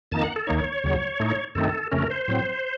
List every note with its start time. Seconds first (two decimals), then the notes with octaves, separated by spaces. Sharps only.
0.12 F2 D#3 A#3 D#4 A5
0.23 F#5
0.36 A4
0.47 D#2 D#3 A#3 D#4 C#5
0.84 D#2 C#3 F#3
1.20 A2 A3 D#4
1.55 F#2 D#3 A3 C4 D#4 A4
1.91 F2 C#3 A3 C#4 A#4
2.10 C5
2.28 A2 F#3 C4